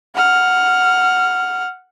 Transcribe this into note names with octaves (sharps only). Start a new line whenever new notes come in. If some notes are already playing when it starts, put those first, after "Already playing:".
F#5 F6